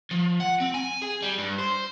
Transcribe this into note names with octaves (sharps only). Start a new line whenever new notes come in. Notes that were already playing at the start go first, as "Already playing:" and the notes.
F3
F#5
C4
G#5
G#4
G3
G2
C5